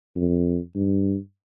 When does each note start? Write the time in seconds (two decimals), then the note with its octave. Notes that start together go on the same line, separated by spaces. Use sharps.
0.16 F2
0.75 G2